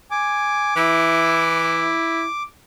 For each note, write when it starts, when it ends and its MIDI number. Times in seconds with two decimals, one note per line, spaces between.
0.11 0.74 80
0.11 2.43 86
0.76 1.93 52
0.76 2.25 64